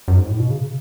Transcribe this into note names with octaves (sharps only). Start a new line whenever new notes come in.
F#2
G#2
A2
B2
C#3